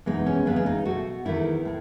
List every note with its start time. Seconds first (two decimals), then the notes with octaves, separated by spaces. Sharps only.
0.06 E2 B2 G#3 B3 D#4
0.26 C#4
0.46 E2 C#3 G#3 B3
0.56 C#4
0.66 D#4
0.85 B2 A3 F#4
1.25 E2 D#3 A3 E4
1.65 A2